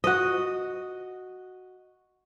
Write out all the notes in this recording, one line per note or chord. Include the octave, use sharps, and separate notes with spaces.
F#4 D#5